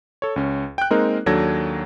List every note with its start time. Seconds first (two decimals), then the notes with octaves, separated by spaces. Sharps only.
0.22 A4 C#5
0.36 C#2 C#4
0.78 G5 F#6
0.90 G#3 A#3 C4 D#4 A#4
1.26 D#2 F#3 D4 A4 G#6 A#6